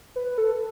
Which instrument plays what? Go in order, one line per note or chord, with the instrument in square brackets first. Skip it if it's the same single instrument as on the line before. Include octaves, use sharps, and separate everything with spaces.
[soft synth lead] B4
A4